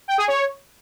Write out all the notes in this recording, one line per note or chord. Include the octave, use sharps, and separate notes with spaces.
G5
G#4
C#5